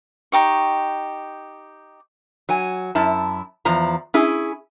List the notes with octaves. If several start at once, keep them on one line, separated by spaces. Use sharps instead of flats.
D#4 G4 C#6
F#3 G#5
F#2 E4 A5
E2 F3 A#5
C#4 E4 G#4